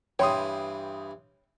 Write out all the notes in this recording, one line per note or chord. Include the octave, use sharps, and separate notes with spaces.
G2 E3 C#5 G5 C6 D#6